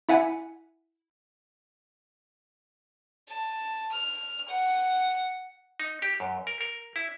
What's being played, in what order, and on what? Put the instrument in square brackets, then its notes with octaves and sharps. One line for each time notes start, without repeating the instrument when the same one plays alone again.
[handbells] E4 E5 F#5 G#5
[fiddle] A5
F6
F#5
[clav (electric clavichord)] D#4
G4
F#2
A#4
A#4
E4